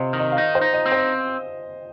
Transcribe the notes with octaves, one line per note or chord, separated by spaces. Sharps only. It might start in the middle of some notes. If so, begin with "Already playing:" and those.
Already playing: C3 C5 D#5 F5
D#3
D#5
F5
D#4 D#5
C5
D#4
D#5
C4
C5